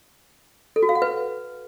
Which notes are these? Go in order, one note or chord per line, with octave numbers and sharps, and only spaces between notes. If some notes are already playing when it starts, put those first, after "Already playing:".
A4
F#4
F5
F#5
B4